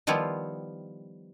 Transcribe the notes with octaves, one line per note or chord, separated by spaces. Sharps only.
D#3 F3 G3 B3 E4 F4